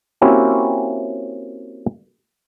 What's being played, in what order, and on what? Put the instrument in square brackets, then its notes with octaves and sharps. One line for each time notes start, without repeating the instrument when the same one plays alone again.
[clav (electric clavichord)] A#3 C4 C#4 E4 F#4 G4